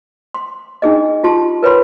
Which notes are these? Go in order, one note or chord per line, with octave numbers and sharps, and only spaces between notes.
C6
D4 D#4 G#4 D#5
F4 G4 A5 C6
A#4 B4 C#5 B5 C6